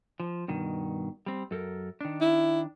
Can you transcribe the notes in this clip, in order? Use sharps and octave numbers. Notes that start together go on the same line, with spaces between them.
F3
G2 B2 D#3
G3 C4
F#2 A4 A#4
D#3 D4
E4